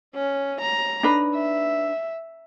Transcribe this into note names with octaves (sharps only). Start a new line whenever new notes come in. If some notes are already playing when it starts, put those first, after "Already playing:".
C#4
A#5
D4 D#4 B4
E5